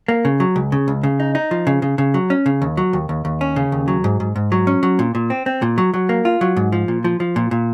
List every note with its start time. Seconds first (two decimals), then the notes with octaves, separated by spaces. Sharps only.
0.08 A#3
0.25 C#3
0.40 F#3
0.56 C#2
0.72 C#3
0.88 C#2
1.03 C#3
1.20 D#4
1.35 D#4
1.51 F3
1.67 C#3
1.82 C#3
1.98 C#3
2.14 F#3
2.30 C#4
2.46 C#3
2.62 D#2
2.77 F#3
2.93 D#2
3.09 D#2
3.25 D#2
3.41 C#4
3.56 C#3
3.72 D#2
3.88 F#3
4.04 G#2
4.20 G#2
4.36 G#2
4.52 F#3
4.67 C#4
4.83 F#3
4.99 A#2
5.15 A#2
5.30 C4
5.46 C4
5.62 A#2
5.78 F#3
5.94 F#3
6.09 A#3
6.25 F4
6.41 F#3
6.57 G#2
6.72 F3
6.88 A#2
7.04 F3
7.20 F3
7.36 A#2
7.51 A#2